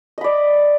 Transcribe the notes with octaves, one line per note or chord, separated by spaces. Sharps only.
D5 D#5 B5